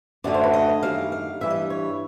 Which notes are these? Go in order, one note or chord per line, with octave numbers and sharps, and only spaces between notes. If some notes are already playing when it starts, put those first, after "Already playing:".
F#2 D3 F#3 A3 D5
C5
B4
D#5
F#2 D#3 G3 F5
F5
G2 E3 G3 E5
D#5
C#5